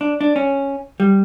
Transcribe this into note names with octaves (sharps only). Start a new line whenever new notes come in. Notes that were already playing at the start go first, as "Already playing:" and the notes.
D4
D4
C#4
G3